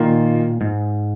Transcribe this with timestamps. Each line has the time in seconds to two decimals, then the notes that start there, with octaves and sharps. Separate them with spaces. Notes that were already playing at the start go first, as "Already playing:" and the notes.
Already playing: A#2 D#3 A#3 F4
0.61 G#2